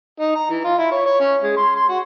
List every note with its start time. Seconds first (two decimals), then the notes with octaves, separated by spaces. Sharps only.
0.20 D#4
0.35 A#5
0.50 E3
0.64 F4
0.78 E4
0.91 C#5
1.05 C#5
1.20 C#4
1.42 G#3
1.57 C6
1.76 C6
1.88 F#4